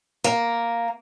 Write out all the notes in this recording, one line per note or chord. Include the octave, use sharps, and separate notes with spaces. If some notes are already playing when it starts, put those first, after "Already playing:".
A#3